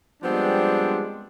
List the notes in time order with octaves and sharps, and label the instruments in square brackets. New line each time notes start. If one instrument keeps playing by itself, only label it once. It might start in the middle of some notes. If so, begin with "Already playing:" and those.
[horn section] F3 G3 G#3 B3 C4 D4